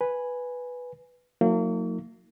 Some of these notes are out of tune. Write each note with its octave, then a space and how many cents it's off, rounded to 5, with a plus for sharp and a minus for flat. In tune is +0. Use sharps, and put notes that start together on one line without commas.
B4 +0 G#5 +0
F#3 -30 A#3 -35 D#4 +35